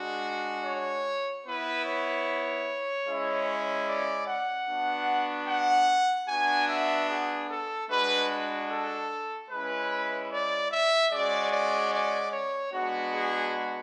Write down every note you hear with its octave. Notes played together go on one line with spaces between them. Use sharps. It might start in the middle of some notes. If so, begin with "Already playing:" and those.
Already playing: G#3 D4 F#4
C#5
B3 E4 B4
C#5
G#3 C#4 E4
D5
F#5
B3 D4 F#4
F#5
B3 D4 F#4 G#5
E5
G#4
A4
G#3 D4 F#4 B4
A4
G#3 C#4 E4 B4
D5
E5
G#3 C#4 F#4 D5
D5
D5
C#5
G#3 B3 D4 F#4
G#4